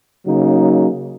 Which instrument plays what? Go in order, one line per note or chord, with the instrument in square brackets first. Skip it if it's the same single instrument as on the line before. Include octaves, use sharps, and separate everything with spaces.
[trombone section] C#3 F#3 A#3 D#4